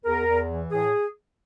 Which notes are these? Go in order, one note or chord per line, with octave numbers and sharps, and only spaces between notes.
E2 A#4
E2
E3
A2 G#4